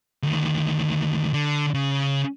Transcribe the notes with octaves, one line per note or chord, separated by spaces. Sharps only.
D2 D#3
D3
C#3